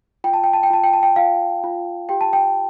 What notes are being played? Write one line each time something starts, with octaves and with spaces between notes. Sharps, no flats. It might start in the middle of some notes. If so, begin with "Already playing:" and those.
F4 G5
A5
G5
A5
G5
F4 A5
G5
A5
G5
F4 F5
F4
G4 G5
A5
G5